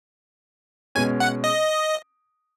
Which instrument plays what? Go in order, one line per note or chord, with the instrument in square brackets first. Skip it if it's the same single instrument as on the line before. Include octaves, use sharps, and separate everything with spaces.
[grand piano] B2 G#3 C#4 [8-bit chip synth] G#5
[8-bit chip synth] F#5
D#5